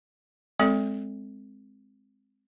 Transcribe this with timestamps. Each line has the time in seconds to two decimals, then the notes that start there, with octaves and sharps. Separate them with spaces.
0.60 G#3 C4 A4 D5